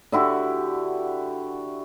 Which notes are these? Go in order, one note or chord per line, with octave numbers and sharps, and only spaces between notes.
D3 E4 F#4 G4